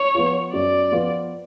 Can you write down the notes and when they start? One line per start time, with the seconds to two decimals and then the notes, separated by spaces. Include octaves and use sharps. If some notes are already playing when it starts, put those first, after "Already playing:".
Already playing: C#5
0.15 F3 B3 F4
0.53 F#2 D5
0.92 F3 B3 F4